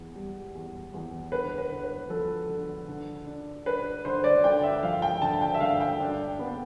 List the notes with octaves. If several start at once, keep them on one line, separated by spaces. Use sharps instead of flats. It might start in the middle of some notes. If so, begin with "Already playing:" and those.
Already playing: E2
G3
E2
E2
D3 B4
B4
D3
B4
F3 A4
D3
D3
D4
D4 B4
D3 C5
D5
D3 G5
E5
F3 F5
G5
D3 A5
G5
E5
D3 F5
G5
D4
B3